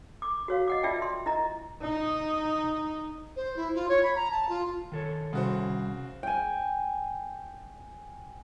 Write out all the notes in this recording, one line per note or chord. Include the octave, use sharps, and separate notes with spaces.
D6
F#4 C#5 F5
D#5 F#5 D6
F4 D5 E5 G5 A5
E5 C6
E4 D#5 A#5
D#4
C5
E4
F4
C#5
B5
A#5
A5
F4
D#3 A4 C#5
C2 C#3 F#4 C5
G5 G#5